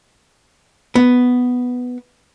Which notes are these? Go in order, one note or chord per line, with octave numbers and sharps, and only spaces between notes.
B3